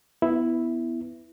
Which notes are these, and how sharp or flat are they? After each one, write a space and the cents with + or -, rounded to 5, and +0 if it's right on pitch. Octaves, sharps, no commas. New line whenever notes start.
B3 +10 E4 +0